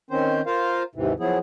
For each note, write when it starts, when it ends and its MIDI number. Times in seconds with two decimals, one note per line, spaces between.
0.11 0.41 51
0.11 0.41 60
0.11 0.41 61
0.11 0.41 72
0.46 0.83 65
0.46 0.83 70
0.46 0.83 72
0.46 0.83 77
0.95 1.14 39
0.95 1.14 44
0.95 1.14 48
0.95 1.14 52
1.20 1.38 53
1.20 1.38 54
1.20 1.38 59
1.20 1.38 64
1.20 1.38 68